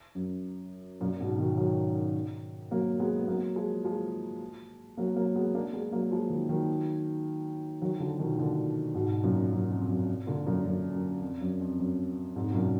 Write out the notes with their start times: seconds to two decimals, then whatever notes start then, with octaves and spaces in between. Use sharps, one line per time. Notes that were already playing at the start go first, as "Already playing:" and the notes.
0.15 F#2
1.01 F#2 A#2
1.20 G#2 B2
1.38 B2 D#3
1.57 D#3 F#3
2.71 F#3 A#3
2.99 G#3 B3
3.19 B3
3.28 F#3 A#3
3.56 F3 G#3
3.84 F3 G#3
4.97 F#3 A#3
5.16 F#3 A#3
5.36 G#3 B3
5.55 A#3 D4
5.73 G#3 B3
5.92 F#3 A#3
6.11 F3 G#3
6.30 D#3 F#3
6.49 D#3 F#3
7.82 D#3 F#3
8.00 D3 F3
8.19 B2 D#3
8.39 A#2 D3
8.94 G#2 B2
9.23 F#2 A#2
9.52 F#2
9.71 F2
9.90 F#2
10.27 A#2 D3
10.46 F#2 A#2
10.65 F#2
10.94 F#2
11.21 F2
11.41 F#2
11.60 F2
11.79 F#2
12.36 F2 G#2
12.51 B2
12.54 F#2 A#2